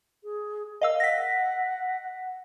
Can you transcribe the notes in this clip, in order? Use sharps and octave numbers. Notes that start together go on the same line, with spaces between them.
G#4
A#4 D#5 F5 E6
F#5 A#6 B6